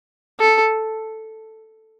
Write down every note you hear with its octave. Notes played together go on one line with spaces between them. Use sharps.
A4